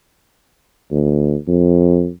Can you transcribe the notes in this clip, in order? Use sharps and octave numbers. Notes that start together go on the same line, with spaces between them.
D2
F2